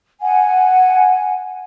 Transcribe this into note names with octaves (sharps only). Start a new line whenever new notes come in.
F#5 G#5